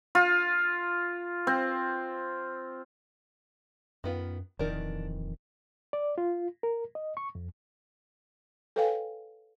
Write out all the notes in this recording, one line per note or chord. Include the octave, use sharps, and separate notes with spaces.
F4
C4
F#2 D#3 B3 F4
D#1 F2 D#3 E3 D4 A#4
D5
F4
A#4
D#5
C#6
F2
A4 B4 C#5 F5 G5 G#5